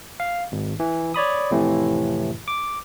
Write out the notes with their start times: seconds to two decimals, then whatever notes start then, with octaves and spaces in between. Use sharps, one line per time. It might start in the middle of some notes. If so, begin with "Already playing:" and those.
0.20 F5
0.52 G#1
0.80 E3
1.14 C#5 D5 B5 D#6
1.51 F2 A2 C3 E3
2.48 D6